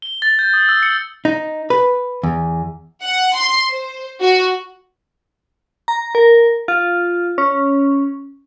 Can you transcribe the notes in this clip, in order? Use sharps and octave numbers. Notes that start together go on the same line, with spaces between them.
G7
A6
G6
D#6
E6
C#7
D#4
B4
E2
F#5
C6
C5
F#4
A#5
A#4
F4
C#4